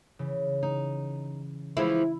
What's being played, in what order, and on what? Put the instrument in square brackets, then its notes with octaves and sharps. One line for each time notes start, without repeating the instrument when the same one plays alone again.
[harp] C#3 E3
[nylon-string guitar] D#4
[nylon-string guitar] E3 F3 G#3 [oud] E4